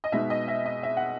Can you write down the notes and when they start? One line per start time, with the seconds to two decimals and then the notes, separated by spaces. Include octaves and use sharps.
0.04 D#5
0.12 B2 G#3 B3 D#4 E5
0.30 D#5
0.48 E5
0.65 D#5
0.83 E5
0.97 F#5